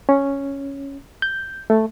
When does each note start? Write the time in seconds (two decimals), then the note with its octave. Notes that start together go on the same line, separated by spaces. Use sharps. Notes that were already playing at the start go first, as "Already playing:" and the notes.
0.09 C#4
1.22 G6
1.70 A3